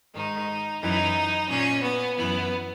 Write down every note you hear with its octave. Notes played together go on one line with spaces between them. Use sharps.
G#2 D#3 D#4
F#2 E3 D#4
A#2 C#4
B3
F#2 E3 B3